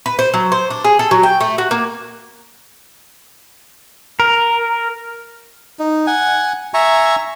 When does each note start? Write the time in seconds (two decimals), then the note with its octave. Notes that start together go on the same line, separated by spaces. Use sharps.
0.06 B4
0.19 C5
0.34 F#3
0.52 C5
0.70 D4
0.84 G#4
0.99 A4
1.11 F#3
1.23 G5
1.41 A3
1.58 F#4
1.71 A#3
4.20 A#4
5.79 D#4
6.07 F#5 G#5
6.74 E5 G#5 A#5 C#6